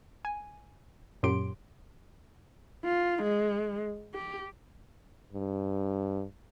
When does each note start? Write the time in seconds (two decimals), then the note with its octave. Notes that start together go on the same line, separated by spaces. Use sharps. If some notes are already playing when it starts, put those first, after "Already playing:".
0.25 G#5
1.23 F#2 A#2 F#3 G4 C6 D7
2.84 F4
3.22 G#3
4.14 G4
5.33 G2